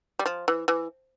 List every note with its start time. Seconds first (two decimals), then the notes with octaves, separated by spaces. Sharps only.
0.19 G3
0.26 F3
0.48 E3
0.68 E3